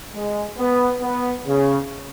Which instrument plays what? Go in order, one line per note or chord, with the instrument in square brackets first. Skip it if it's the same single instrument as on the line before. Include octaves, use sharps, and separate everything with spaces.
[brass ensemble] G#3
B3
B3
C#3